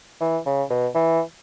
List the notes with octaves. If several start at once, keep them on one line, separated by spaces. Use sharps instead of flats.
E3
C#3
B2
E3